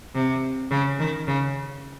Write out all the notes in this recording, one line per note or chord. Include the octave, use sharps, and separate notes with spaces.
C3
C#3
D#3
C#3